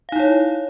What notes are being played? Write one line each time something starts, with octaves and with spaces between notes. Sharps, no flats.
D#4 E4 C#5 F5